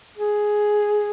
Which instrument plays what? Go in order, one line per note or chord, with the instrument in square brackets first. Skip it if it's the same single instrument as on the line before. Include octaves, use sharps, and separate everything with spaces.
[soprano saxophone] G#4